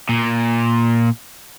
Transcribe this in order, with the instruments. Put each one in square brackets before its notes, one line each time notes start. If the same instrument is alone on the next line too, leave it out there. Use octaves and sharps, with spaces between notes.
[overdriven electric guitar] A#2